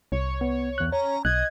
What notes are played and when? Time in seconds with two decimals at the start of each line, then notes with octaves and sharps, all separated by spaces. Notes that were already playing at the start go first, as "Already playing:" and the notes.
0.12 C2 C#5
0.41 B3
0.78 E2 F#6
0.92 C#4 C#5 A#5
1.25 B1 D#5 F#6 G#6